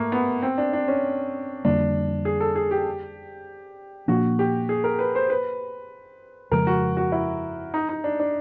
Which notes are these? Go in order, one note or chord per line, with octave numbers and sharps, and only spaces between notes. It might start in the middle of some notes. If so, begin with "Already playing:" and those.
Already playing: G#2 A3 A#3
B3
C4
D4
D4
C#4
F2 D3 G3 A#3 D4
G#4
A4
G#4
G4
A#2 F3 A#3 D4 F#4
G4
G#4
A#4
B4
C5
B4
F2 C#3 F3 G#3 A#4
F#4
F#4
E4
D#4
D#4
D4
D4